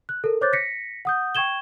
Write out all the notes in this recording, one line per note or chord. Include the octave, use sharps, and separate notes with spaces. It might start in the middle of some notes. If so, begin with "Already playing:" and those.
F#6
A4 A#4
C5 C#5 D6 F#6 G6 A6
A#6 B6 C#7
F#5 D#6 G6
G5 C#6 G#6 E7 G7